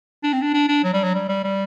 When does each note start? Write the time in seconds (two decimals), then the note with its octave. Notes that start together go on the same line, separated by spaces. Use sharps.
0.23 D4
0.33 C4
0.42 D4
0.54 D4
0.68 D4
0.84 F#3
0.93 G3
1.04 F#3
1.14 G3
1.29 G3
1.44 G3